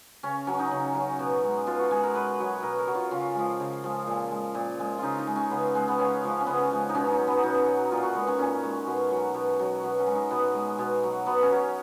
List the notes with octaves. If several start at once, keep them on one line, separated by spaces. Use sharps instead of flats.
C#3 C#4
F#3 C#4
D#4
C#3
F#3
B2
G#3
B2 F4
F#4
G#3 G#4
A#4
B2 B4
F#3
B2 A#4
A#4
F#3
F4
C#3 F4
F3 G#3
C#3
F3 G#3
A#2
G#3
A#2
G#3
C#3 D#4 F4
D#4
G#3
C#4
C#3 B3
G#3
B3
C#3 C#4
F3 G#3
C#4
C#3 B3
F3 G#3
D#4
B2 C#4
D#4
F#3
B3
B2 D#4
F#3
A#2 F4
F#4
G#3 B3
C#4
A#2 C#4
G#3
B2
F#3
B2
F#3
B2
C#4
G#3
D#4
B2 B3
G#3
B2
F#3
B2 B3
C#4
F#3